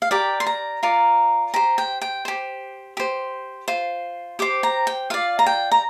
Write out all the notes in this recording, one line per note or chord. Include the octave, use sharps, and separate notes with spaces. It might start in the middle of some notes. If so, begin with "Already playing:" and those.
F5
G4 A#4 D5 G5
C6
A#5
F4 A#4 D5
G4 C5 A#5
G5
G5
G4 C5
G4 C5
F4 C5
G4 C5 D6
A#5
G5
F4 D5 F5
A#5
G5
A#5